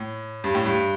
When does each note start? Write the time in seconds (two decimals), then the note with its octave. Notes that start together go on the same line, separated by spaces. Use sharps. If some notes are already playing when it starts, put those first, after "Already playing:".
Already playing: A2
0.44 G2
0.55 A2
0.66 G2